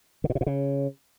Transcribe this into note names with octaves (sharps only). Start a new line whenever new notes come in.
D3
A#2
C3
A#2
C#3